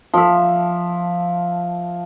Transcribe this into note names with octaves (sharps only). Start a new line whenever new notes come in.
F3 E5